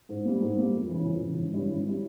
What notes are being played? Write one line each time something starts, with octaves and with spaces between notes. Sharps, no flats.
G#2
G3 A#3
G#2
G3 A#3
F2
C#3 E3
F2
C#3 E3
G#1
G2 G3 C#4 E4
G#1
G3 C#4 E4